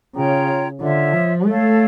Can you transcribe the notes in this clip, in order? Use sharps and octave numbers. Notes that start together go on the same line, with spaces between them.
C#3 F4 C#5 G5 A#5
D3 F4 C#5 E5
F3
A3 A4 C#5 F5